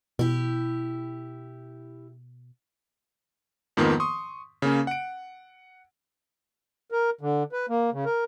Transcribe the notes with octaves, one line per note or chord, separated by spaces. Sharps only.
B2 E4 G4
F2 G#2 D#3 F3 A#3 B3
C6 C#6 D#6
C#3 A#3 C#4
F#5 D7
A#4
D3
B4
A#3
C#3
A#4